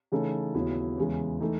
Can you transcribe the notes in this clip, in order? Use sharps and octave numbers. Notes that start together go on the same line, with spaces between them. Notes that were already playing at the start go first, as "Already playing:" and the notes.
C#3 E3 A3 D#4 A4
D#2 C#3 F#3 B3 E4
E2 C#3 E3 G#3
E3 A3 D#4 A4